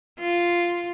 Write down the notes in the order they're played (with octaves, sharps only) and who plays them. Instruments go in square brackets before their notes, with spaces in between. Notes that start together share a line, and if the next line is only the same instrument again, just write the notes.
[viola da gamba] F4